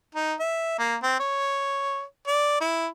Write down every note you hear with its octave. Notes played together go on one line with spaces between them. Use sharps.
D#4
E5
A#3
C4
C#5
D5
E4